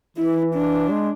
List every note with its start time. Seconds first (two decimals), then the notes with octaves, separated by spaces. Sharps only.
0.17 E3 E4
0.54 D4
0.90 G#3